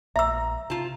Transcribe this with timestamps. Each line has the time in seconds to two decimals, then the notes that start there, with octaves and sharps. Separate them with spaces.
0.16 A#1 E5 A#5 E6
0.70 C3 F4 A5